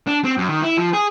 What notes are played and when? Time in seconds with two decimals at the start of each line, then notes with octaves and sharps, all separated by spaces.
0.07 D4
0.25 C4
0.37 F#2
0.49 D#3
0.62 E4
0.77 F3
0.93 G#4